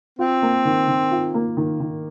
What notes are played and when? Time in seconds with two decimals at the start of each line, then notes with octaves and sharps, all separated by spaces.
0.19 C4 F4
0.42 A#3
0.65 D#3
0.88 D#3
1.11 F4
1.34 A#3
1.57 D#3
1.80 D#3